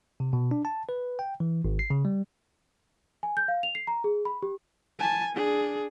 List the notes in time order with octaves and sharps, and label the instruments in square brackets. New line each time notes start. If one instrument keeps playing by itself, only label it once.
[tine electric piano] C3
B2
D4
A5
B4
G5
E3
G#1
C7
C#3
G3
[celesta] G#5
G6
F5
F7
C7
A#5
G#4
B5
G4
[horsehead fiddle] G#5 A5
D4 G#4